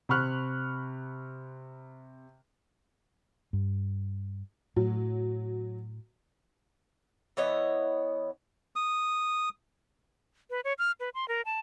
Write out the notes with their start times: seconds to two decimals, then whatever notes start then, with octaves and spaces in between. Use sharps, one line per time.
0.09 C3 B5 C#6 F6 F#6
3.53 G2
4.76 A2 F#3
7.37 E3 B3 C#5 D#5
8.76 D#6
10.50 B4
10.64 C#5
10.79 F6
11.00 B4
11.14 C6
11.28 A#4
11.45 A5